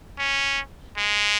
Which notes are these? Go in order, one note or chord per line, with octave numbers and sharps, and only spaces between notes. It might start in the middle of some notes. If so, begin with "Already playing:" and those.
C#4
G#3